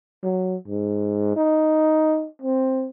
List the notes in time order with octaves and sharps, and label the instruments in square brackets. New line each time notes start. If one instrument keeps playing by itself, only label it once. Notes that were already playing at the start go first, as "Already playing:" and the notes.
[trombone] F#3
G#2
D#4
C4